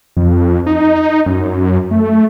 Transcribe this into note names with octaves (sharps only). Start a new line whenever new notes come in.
F2
D#4
F#2
A3